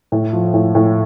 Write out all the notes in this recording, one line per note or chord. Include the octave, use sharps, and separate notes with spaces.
A2
F3
A2
A2